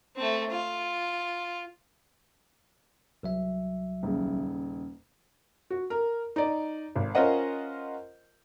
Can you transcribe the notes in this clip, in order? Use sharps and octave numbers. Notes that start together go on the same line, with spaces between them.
A3 C4
F4
C2 F#3 E5
D#1 C#3
F#4
A#4
D#4 D5
G#1
C#4 F4 A#4 C5 D#5 F#5